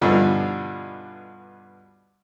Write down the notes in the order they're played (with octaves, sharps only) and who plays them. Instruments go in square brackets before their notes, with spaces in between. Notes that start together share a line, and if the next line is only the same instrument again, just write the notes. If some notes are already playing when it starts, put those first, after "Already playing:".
[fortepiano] G2 B2 D3 E3 F3 D#4